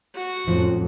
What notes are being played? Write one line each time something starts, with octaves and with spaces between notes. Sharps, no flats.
F#4
A1 F2 G#2 F3